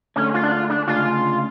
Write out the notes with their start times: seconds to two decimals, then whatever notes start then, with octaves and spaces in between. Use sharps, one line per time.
0.16 D2 D3 G#3 C#4
0.34 F4
0.44 D4
0.52 F4
0.70 D4
0.87 D2 C#3 G#3 D4 F4